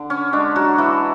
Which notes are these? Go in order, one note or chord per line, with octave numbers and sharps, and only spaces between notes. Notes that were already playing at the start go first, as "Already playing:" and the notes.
Already playing: D3
C#4
G#3 D4
F#3 F#4
D3 E3 E4